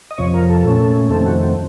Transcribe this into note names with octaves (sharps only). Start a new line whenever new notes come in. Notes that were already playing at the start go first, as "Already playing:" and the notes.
D#5
F2 C3 F3 C#5
A#4
A4
A#2 A3 C#4
F2 C3 D#3 A3 C4 A4
F#4